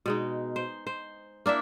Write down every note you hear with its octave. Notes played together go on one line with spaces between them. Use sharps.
B2 G#3 D#4
C5
C5
A#3 D4 E4 E5